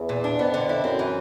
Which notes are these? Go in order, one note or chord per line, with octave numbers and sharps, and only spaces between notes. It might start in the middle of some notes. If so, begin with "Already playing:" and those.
Already playing: E2
A#2
D4
F2 B3
D3
E4
F#2 C4
E3